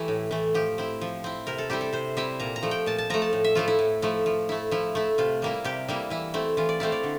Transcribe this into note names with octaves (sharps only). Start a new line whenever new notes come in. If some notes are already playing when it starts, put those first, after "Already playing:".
Already playing: E3 A3 E4 G4 A4
A2
E3 A3
F3 G4
C4 E4
F3
C4 E4
C3 A#4
A4
G3 C4 E4 G4
A4
C3 C5
G3 C4 E4 E5
A#2 A#5
A#5
F3 A3
G5
A#2 A5
A5
F3 A3 A#5
A5
A2
E5
F3 A3 E4 F4
E4
A2
F3 A3 E4
F3
A3 E4
F3 E4
A3 E4
C3 F4
G3 A#3 E4
C3 G4
G3 A#3 E4
E3 E4
A3 C4 E4
E3 F4
D5
A3 C4 E4 F5
D5
D3